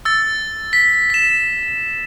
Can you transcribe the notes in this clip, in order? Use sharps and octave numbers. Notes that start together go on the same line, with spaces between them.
E6 A6
B6
B6 E7